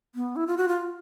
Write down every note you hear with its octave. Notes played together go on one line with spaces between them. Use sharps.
B3
E4
F4
F#4
F4